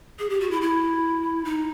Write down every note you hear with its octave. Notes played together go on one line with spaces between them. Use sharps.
G#4
G4
F#4
E4
E4
D#4